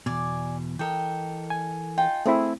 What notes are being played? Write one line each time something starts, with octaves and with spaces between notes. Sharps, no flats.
E2 B2 D5 G#5
E3 A4 A#4 D#5 G5
G#5
D#4 F4 G5
A3 C4 E4 G#4